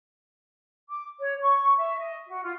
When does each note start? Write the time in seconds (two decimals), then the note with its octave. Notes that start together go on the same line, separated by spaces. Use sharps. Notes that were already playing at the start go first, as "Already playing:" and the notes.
0.89 D6
1.20 C#5
1.42 C#6
1.77 E5
2.00 D#5
2.27 F#4
2.43 F4